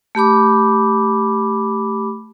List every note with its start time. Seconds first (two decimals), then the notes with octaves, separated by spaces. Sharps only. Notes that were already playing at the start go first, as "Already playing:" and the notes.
0.15 A3 G4 B5 D6